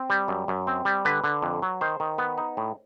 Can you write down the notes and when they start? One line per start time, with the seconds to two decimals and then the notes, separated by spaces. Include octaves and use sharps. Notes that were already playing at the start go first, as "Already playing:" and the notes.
Already playing: C4
0.10 G3
0.28 F#2
0.48 F#2
0.67 C4
0.85 G3
1.05 D3 B4
1.24 D3
1.43 F2
1.62 F#3
1.81 D#3 C5
2.00 D#3
2.18 B3
2.38 D#4
2.57 A2